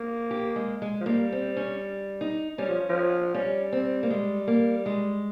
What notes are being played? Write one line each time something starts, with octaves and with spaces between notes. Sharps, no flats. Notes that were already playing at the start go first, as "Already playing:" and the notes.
Already playing: A#3
G4
G#3
G#3
F3
G3 A#3
C4
C#4
D#4
G3 C#4
F3
F3
G3 C#4
C4
A#3
G#3
A#3
G#3